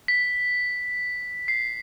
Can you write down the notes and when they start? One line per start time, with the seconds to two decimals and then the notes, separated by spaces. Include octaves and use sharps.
0.08 B6
1.48 C7